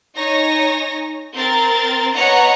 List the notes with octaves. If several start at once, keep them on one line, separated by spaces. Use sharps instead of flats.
D#4 C#5 G#5 A#6
C4 A#4 A6
B3 C#5 D#5 F#5 A#5